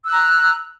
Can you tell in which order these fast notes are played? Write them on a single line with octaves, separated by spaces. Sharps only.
E6 F#6 A#5